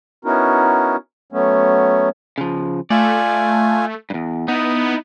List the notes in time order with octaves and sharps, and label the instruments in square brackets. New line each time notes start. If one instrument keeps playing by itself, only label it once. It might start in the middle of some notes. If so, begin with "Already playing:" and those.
[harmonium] B3 C#4 D#4 E4 F#4 A#4
F#3 A3 B3 C#4
[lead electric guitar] C#3 F3
[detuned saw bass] A3 [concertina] F4 G#5 [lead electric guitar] D5
[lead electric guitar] E2 G2
[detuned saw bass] B3 [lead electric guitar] D#4 E4 [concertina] D#6